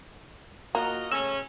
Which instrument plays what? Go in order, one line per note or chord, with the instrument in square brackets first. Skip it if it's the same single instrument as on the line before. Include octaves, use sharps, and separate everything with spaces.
[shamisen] A#3 [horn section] F4 F#4 D#5
[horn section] C#3 A3 C#4 [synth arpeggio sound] E6